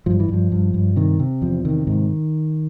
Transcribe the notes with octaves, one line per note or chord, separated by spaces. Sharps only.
G2 F3
E3
G2 F3
G2
G2
C3 D#3
C3
E2 F3
C3 D#3
G#2 D#3